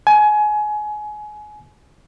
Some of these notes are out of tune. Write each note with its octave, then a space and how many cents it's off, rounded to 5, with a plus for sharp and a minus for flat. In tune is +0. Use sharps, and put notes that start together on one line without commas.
G#5 +25